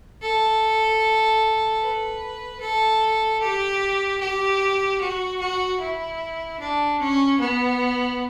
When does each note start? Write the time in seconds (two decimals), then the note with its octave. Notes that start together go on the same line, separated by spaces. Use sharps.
0.22 A4
1.81 B4
2.61 A4
3.41 G4
4.20 G4
5.00 F#4
5.40 F#4
5.80 E4
6.59 D4
7.00 C#4
7.40 B3